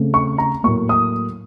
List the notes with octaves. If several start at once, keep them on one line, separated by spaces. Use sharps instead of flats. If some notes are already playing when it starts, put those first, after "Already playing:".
Already playing: C#3 A3 C4
C#6
A#5
A2 F#3 A#3 C#6
D#6